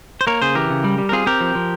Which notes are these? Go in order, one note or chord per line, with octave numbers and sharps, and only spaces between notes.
C5
A#3 A#4 C#5
C#3 G#4 C5
E3 G4 A#4
C#3
G3
G3
A#4
C4 F4 G#4
C4 G4 A#4
F3
F3